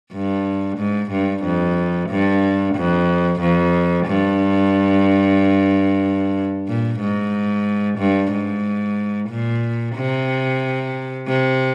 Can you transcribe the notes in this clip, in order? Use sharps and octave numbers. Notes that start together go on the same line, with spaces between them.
G2
G#2
G2
F2
G2
F2
F2
G2
A#2
G#2
G2
G#2
A#2
C3
C3